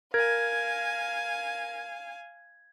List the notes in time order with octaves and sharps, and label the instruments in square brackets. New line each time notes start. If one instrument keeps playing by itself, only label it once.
[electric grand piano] A#4 [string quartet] F5 G#5 [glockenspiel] G#6